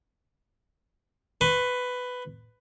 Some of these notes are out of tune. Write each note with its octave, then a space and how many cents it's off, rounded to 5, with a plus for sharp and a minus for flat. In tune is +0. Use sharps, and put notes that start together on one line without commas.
B4 +10 C#6 -45